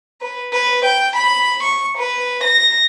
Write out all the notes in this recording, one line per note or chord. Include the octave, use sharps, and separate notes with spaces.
B4
B4
G5
B5
C#6
B4
A#6